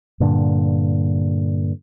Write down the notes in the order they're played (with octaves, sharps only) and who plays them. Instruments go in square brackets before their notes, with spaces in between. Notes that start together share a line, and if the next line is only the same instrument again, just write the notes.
[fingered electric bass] G2 A#2 D3